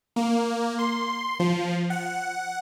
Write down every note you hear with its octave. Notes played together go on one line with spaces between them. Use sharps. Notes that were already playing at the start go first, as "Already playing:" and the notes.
A#3
C6
F3
F#5